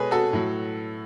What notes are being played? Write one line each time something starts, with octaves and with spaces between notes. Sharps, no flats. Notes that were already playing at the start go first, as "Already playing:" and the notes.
Already playing: B2 G#3 G#4 A4 B4 C#5
F#4 A4
A2 F#3